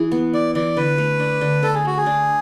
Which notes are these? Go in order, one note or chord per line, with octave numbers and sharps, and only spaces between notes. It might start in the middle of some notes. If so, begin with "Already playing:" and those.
Already playing: E3 E4 G#4
B3
E4 D5
E3 D5
D3 B4
A3
D4
D3
D3 A4
G#4
A3 F#4
G#4
D4